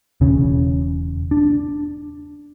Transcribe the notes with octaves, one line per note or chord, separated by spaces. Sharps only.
E1 C#3 C#4
D4